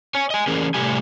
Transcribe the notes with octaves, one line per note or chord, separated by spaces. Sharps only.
C#5 G#5
D#5 G#5
E3 C#4 G#4 A#4
A2 C3 G3 A3 G4 G#5